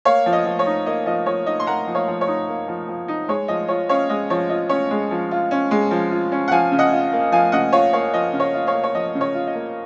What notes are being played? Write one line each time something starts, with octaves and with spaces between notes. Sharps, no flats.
A#3 C#5 F5
F3
D#5
F3
C#5
D#4
A#3 D#5
F3 D#5
F3 C#5
D#4 D#5
C6
A#3 F#5 A#5
F3
C#5 F5
F3
C#5
D#4
A#3
F3
F3
D#4
G#3 C#5
F3 D#5
F4 C#5
C#4 C#5 F5
G#3 D#5
F3 C#5
F4 D#5
C#4 C#5
G#3
F3
F4
C#4
G#3
F3
F4
C#4
F#5
F3 F5 G#5
C#3
D#5 F#5
F4
A#3
F3 F5 G#5
C#3 D#5 F#5
F4 C#5 F5
A#3 C#5 F5
F3 D#5
C#3
C#5 F5
F4
C#5 F5
A#3
C#5
F3 D#5
C#3
C#5
F4
D#5
A#3